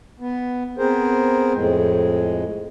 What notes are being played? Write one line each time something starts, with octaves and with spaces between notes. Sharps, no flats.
B3
B3 C4 G#4 A#4 C5
F2 A2 G#3